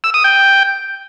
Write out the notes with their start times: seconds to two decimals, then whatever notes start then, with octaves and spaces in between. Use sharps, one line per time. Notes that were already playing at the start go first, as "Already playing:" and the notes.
0.04 E6
0.14 D#6
0.24 G5